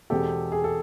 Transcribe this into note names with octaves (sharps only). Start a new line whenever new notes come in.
E2 B2 G#3 C4 G4 A4
G#4
A4